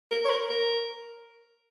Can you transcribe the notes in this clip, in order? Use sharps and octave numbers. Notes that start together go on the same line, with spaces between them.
A#4
C#5
A#4
A#4